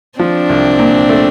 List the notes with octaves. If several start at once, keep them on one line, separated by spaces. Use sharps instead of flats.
F3 C4 D4
C2
A#2
A3